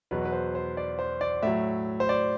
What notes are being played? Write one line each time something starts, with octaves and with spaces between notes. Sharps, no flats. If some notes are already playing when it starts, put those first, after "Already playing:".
E2 B2 F#3 B4
B4
C5
C5
D5
C5
D5
A2 F#3 E5
C5
D5